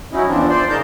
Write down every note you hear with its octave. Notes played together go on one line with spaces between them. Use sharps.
F#3 C#4 D#4 E4
E2 E3 F3 C4 D4
C5 D5 C6
C#3 D#4 A#4 A5 G6